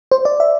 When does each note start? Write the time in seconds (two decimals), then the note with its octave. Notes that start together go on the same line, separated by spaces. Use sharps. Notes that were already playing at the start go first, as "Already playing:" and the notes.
0.11 C5
0.25 D5
0.40 E5